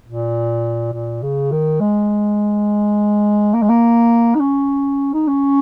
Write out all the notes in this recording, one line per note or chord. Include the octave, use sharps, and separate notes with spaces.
A#2
A#2
C#3
D#3
G#3
A#3
G#3
A#3
D#4
C#4
D#4
C#4